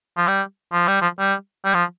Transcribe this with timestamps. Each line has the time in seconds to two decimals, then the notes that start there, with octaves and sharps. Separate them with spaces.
0.17 F3
0.27 G3
0.73 F3
0.88 G3
1.01 F3
1.20 G3
1.65 G3
1.74 F3